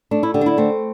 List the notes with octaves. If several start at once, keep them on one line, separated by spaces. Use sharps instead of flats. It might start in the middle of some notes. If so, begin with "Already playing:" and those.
A3 D4
E4
D3 G4
D4
E4
A3 C4